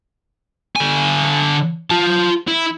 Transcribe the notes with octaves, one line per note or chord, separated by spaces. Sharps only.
D3 G#5
F4 A5
E4